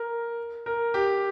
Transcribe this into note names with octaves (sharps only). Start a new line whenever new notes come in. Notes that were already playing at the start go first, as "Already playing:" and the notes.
Already playing: A#4
A#4
G4